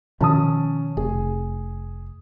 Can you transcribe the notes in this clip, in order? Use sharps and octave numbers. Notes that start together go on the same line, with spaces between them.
B2 D#3 F3 C#4 A5 D#6
F1 G#4